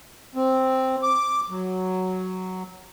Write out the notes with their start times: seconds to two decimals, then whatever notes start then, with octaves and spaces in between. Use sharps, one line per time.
0.35 C4
1.03 D6
1.50 F#3